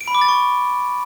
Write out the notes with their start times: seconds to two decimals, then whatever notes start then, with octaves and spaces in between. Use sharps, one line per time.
0.01 D7
0.08 B5
0.15 D6
0.21 A6
0.28 C#6